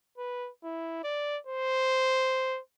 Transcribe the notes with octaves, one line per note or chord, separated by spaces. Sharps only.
B4
E4
D5
C5